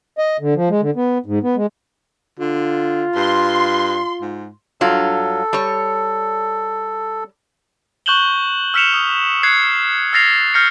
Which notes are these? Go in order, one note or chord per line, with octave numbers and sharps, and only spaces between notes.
D#5
D3
F3
G#3
D3
B3
G#2
B3
G#3
D3 F4
G2 C6
G#2
G2 F#3 F4 A4
G3 C#5
C#6 F#6 G6 E7 F#7 G7
E6 F6 B6 C#7 E7 F7
D#6
F#6 G#6 C7 C#7
E6 F6 A6 A#6 C7 F7
F6 G6 A#6 C7 C#7